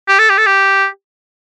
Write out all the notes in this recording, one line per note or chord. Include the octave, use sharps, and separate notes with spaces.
G4
A4
G4
A4
G4